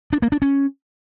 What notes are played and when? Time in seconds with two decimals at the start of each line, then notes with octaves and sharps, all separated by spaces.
0.13 D4
0.22 A#3
0.32 D4
0.42 C#4